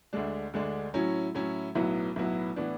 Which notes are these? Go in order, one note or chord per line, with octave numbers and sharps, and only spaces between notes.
D2 D3 G#3 D4
D2 D3 G#3 D4
A2 F#3 C#4 E4
A2 F#3 C#4 E4
B1 A2 F#3 B3 E4
B1 A2 F#3 B3 E4
A2 E3 B3 D4